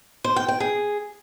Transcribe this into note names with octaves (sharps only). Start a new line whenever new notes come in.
C5
G5
G5
G#4